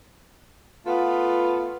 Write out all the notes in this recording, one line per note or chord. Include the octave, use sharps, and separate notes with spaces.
A3 B3 F4